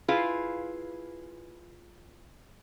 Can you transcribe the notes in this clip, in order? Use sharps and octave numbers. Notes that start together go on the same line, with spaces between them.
E4 F4 G#4 B4 F5